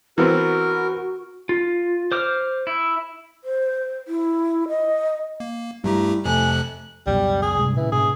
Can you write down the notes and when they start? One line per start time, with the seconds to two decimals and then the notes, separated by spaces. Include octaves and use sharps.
0.18 E3 B3 C4 F#4 A#4
1.49 F4
2.12 C5 D6 F6
2.67 E4
3.44 C5
4.08 E4
4.68 D#5
5.40 A#3
5.84 G2 G3 A3 E4 G4 A#5
6.25 F2 C3 F3 A3 G#5 F#6
7.07 C#2 F#2 B2 G3
7.42 G#4
7.59 G2 C3 G#3
7.77 A#2 C#3 E3
7.92 G#2 B2 D4 G#4